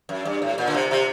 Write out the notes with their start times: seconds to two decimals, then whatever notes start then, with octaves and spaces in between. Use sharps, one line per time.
0.09 F#2
0.25 G2
0.42 A2
0.58 A#2
0.68 D3
0.74 C3
0.91 C3